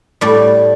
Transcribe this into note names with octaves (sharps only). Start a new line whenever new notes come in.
A2 G3 D5